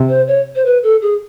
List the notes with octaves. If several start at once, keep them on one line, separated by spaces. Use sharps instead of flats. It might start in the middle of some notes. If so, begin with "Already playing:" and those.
Already playing: C3
C5
C#5
C5
B4
A4
G#4